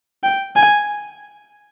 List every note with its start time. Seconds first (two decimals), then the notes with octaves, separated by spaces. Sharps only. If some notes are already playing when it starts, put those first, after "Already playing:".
0.24 G5
0.56 G#5